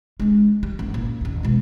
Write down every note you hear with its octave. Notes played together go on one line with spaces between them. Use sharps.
G#3 D4
G3
F#1
A#2
F#1 D#2
B2 G#3